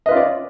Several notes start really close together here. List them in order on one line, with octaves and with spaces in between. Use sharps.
D#5 B4 F4 C#4 D5